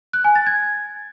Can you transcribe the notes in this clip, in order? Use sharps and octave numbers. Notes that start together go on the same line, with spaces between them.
F#6
G#5
A6
G#6